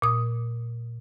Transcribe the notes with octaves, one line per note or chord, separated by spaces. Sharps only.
A#2 D#6